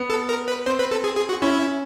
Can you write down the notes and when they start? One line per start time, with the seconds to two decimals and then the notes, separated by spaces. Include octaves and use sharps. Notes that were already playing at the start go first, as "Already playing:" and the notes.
Already playing: B3
0.10 A4
0.29 A#4
0.48 B4
0.66 C4 C5
0.79 B4
0.91 A4
1.04 G#4
1.16 G#4
1.29 F#4
1.42 C#4 E4